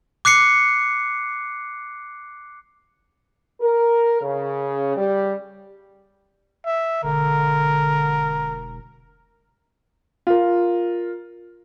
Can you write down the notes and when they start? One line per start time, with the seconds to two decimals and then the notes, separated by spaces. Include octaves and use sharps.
0.25 D6 F#6 C7 C#7
3.61 A#4
4.22 C#3
4.96 G3
6.66 E5
7.03 E1 D3 A#4
10.27 F4 A#4